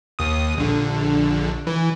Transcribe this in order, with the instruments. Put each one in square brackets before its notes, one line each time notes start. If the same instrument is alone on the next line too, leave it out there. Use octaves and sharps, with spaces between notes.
[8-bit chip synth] D#2 D#6
A#1 D3
E3